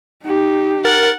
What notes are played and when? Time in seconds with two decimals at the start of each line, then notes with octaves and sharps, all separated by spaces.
0.24 D#4 G4
0.85 A#4 F#5 A6